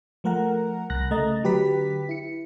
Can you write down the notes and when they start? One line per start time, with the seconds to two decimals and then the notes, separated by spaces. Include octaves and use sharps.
0.24 F3 A3 A#4 F#5 A#5
0.90 C2 F#6 A#6
1.11 C#3 A3 D#5 A#5 A6
1.43 D3 F#3 G4 B4 B6
2.09 E4 C#7